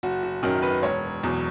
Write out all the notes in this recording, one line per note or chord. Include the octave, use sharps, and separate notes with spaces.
F#1 F#4
F#4
F#2 D#3 F#3 A#4
B4
E1 C#5
E2 B2 F#3